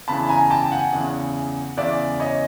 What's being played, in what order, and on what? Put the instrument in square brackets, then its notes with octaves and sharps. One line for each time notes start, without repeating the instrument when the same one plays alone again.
[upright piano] E2 C#3 E3 A5 B5
G#5 A#5
G5 A5
F#5 G#5
E2 C#3 E3
E2 C#3 E3 D5 E5
C#5 D#5